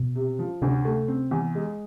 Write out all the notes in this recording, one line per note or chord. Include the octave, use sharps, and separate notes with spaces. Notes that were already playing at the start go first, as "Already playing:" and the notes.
Already playing: B2
C3
F3
D2 C3
A3
C4
E2
G#3